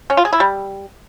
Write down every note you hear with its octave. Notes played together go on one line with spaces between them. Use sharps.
C#4
F4
G#4
E4
G3